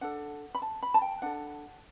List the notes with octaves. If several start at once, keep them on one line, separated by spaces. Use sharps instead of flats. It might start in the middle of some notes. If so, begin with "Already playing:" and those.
D4 A4 F#5
B5
A5
B5
A5
G5
D4 A4 F#5